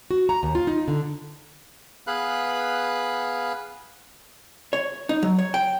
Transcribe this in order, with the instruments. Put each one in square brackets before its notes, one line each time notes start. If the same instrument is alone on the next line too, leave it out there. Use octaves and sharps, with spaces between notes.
[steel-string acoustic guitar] F#4
A#5
D#2
F4
D#4
D3
[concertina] B3 G#4 B4 F5 B5 F#6
[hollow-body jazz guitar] C#5
D#4
F#3
C#5
G5